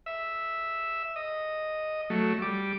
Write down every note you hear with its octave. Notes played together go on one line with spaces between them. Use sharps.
E5
D#5
F#3 A3
G3 D6